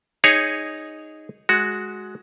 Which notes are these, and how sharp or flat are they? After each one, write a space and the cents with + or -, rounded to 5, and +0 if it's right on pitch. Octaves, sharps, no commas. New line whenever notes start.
D#4 +0 G#4 -10 C#5 +0
G#3 +10 F#4 +0